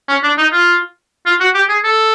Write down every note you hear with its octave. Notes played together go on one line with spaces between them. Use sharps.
C#4
D4
D#4
F4
F4
F#4
G4
G#4
A4